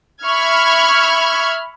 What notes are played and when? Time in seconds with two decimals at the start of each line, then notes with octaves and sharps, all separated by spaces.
0.24 E5 B5 C#6 F6 G#6